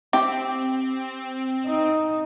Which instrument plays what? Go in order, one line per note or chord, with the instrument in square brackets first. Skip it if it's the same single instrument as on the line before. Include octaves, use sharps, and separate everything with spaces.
[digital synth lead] C4 [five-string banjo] G4
[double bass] D#4